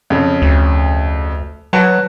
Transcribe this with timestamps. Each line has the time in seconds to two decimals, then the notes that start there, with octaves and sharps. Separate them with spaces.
0.10 F2 C#3
0.42 D2
1.73 F#3 F#4 B4 A5